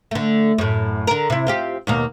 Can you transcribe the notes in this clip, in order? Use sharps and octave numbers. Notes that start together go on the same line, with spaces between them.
D3 A3
F#2 A2
D3 A#4
C3 E4
C4 F4 G4
D#2 B2 A#3